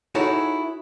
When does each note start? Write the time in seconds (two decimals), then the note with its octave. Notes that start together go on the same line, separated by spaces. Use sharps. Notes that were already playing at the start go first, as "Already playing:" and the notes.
0.15 D#4 E4 F#4 G#4 A4 C#5